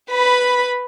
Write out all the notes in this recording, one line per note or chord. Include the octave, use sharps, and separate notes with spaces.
B4 B5